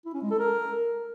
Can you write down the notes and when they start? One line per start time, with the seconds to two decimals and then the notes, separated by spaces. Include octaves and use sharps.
0.06 E4
0.14 C#4
0.22 G#3
0.31 A4
0.39 A#4